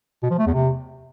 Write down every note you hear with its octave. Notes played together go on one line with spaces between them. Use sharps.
B2
F3
A3
E2
C3